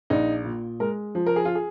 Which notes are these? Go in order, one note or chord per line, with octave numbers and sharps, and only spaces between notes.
A#1 D#4
A#2
G#3 A#4
F3
A#4
G#4
F4
G#4